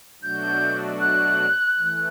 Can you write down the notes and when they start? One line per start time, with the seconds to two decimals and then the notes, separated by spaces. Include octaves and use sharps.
0.22 B2 F#3 A3 D4 F#4 G6
1.00 F#6
1.77 E3 A3